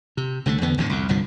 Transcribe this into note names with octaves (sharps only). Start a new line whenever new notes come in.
C3
C2 D3 F#3 A3
E2 D3 B3
G#1 F2 A2 D3
C2 F2
G1 C2 G2 F3